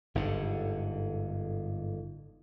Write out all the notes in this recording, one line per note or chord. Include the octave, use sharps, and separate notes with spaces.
G1 G#2 D3